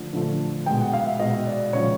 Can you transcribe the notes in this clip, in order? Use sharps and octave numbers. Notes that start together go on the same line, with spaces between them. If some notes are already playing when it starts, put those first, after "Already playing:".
Already playing: D3 F3 A3
D3 F3 A3
B2 G#3 G5
F#5
F5
E5
B2 G#3 D#5
D5
C#3 F3 G#3 C#5